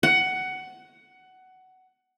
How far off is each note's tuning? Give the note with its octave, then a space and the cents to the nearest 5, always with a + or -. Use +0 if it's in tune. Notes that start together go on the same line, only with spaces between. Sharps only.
F#5 +15